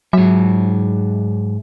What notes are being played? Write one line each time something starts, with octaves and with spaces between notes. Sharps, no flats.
G#2 F#3 E5